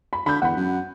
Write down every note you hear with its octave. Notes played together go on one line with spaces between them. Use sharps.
B5
D3 B5 G6
E2 F#5 B5
F#2